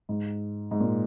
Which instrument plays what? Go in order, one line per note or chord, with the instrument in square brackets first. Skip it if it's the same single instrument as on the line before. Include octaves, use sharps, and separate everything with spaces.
[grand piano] G#2
G#2
A#2